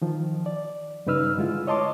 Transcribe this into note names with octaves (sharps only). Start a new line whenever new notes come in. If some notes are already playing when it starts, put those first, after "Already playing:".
D#3 F3
D5
G2 C#3 D#4 B4 E6 F6
D3 G#3 E4 F4
C#5 D#5 A5 C6 D6